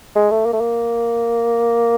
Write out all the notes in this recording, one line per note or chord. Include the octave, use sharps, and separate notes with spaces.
G#3
A3
A#3
A3
A#3